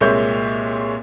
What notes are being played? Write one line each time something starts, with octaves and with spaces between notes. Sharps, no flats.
C2 A#2 G#3 C#5 E5 G6